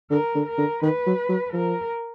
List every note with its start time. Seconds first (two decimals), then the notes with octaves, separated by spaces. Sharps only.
0.11 D3 A#4
0.35 D3
0.46 A#4
0.58 D3
0.82 D#3 B4
1.07 F#3
1.29 F#3
1.53 F3 A#4